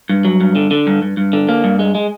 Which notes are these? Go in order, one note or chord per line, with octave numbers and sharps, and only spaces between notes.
G2
F#3
G2
D3
D3
G2
G2
G2
D3
A#3
G2
G#3
G#3